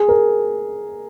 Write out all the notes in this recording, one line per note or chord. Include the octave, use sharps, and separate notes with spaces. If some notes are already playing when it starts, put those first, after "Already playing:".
Already playing: G#4
A#4